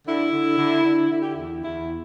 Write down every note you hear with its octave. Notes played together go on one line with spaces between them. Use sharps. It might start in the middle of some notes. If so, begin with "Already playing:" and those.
D3 E4
D3
D3
D3
D3 E4
G4
E2 E4
E2 E4